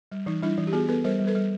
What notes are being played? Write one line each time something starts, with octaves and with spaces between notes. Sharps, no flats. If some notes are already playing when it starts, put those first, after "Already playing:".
G3
E3 D#4
G3 D4 E4
E3
G4
B3 F#4 G#4
B3 A4 B4
G3 A#4 C5
G3
A4 B4
G3